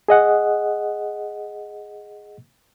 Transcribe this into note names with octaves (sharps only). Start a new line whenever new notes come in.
G#4 D#5 F#5